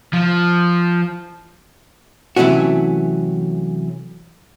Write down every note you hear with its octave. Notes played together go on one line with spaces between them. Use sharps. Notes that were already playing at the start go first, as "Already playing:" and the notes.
F3
C3 E3 F#3 A3 C#4 F#4